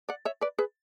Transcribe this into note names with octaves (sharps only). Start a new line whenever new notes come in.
D5 F#5
C#5 E5
B4 D5
G#4 B4